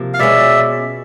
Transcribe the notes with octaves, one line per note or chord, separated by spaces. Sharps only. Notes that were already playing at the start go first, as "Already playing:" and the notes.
Already playing: C3 F3 A#3
F5
B2 G#3 C#4 D5 E5